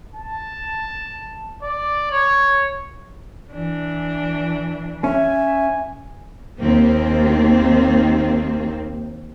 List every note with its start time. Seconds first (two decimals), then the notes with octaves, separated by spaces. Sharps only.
0.15 A5
1.62 D5
2.11 C#5
3.51 E3 D4
5.04 C#4 E5 G#5
6.59 D#2 A#3 C4